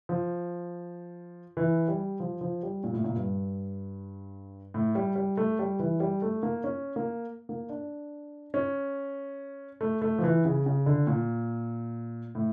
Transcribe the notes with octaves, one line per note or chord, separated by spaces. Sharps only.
F3
E3
G3
F3
F3
G3
A#2
A2
A#2
G2
A2
G3
G3
A3
G3
E3
G3
A3
A#3
C#4
A#3
A#3
D4
C#4
A3
A3
F3
E3
C#3
C#3
D3
A#2
A2